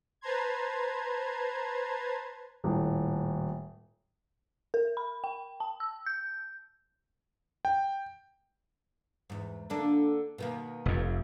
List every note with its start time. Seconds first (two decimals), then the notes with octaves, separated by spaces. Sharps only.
0.21 B4 C5 A5 A#5 C6 G#6
2.64 D#1 A2
4.74 A#4
4.97 B5
5.24 G5
5.60 A5
5.80 E6
6.06 G6
7.65 G5
9.30 E2 G#2
9.70 D3 A#3 D4
10.38 B2 D#3 A#3
10.86 F1 F2